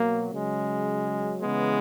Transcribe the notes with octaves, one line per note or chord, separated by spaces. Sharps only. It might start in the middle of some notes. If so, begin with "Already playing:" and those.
Already playing: B2 F#3 A#3
C#3 F#3 G#3
C#3 E3 G#3 B3